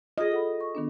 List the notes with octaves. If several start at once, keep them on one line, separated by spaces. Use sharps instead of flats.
F4 G#4 D#5
A4 F#5 B5
C#6
D#3 B3 D4